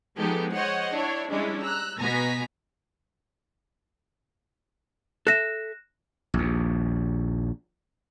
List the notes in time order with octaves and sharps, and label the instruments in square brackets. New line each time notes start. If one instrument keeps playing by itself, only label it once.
[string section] F3 G#3 B3 D#4 G4 A4
C5 C#5 D#5 F#5
D4 E4 C#5
G3 G#3 C#4 D4 E4
A#5 E6 F#6
B2 B3 G#5 A#5 A#6 B6
[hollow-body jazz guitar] A4 E5 [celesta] F#6 A#6 E7
[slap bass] A#1 D#2